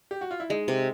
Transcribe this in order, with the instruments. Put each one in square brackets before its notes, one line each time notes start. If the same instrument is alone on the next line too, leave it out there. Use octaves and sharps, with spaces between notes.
[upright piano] G4
F#4
F4
E4
[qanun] G#3 [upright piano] D#4
[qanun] C3